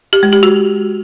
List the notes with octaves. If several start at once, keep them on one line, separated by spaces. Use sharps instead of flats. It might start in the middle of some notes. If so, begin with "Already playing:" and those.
G4
G#3
G4
F#4